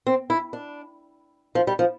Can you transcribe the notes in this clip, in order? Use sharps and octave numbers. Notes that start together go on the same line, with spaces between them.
C4
E4
D4
F3
G3
F3